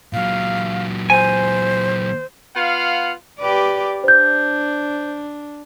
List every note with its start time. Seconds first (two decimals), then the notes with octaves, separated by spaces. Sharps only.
0.13 A#2 F#3 F5
1.10 C5 G#5
2.56 B3 F4 F5 F#5
3.39 G4 B4 D5
4.04 D4 C5 G6